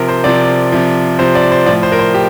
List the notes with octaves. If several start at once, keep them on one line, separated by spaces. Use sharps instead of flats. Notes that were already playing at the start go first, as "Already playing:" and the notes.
Already playing: C3 F3 A#4
C5
C3 F3 D5
C3 F3
C3 F3 C5
D5
C5
A2 F3 D5
C5
A#4
C5
G4